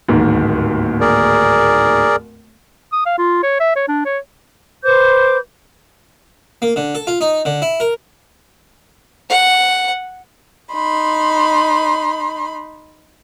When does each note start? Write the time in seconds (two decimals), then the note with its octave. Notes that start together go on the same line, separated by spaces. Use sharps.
0.08 D1 D#2 G#2
1.01 G#4 A#4 D5
2.92 D#6
3.06 F5
3.18 F4
3.43 C#5
3.60 E5
3.76 C#5
3.88 D4
4.05 C#5
4.84 B4 C5 D6 G6
6.62 A#3
6.76 D3
6.95 A4
7.07 F4
7.21 D#4
7.45 D3
7.62 E4
7.80 A#4
9.30 F#5
10.72 D#4 B5 C6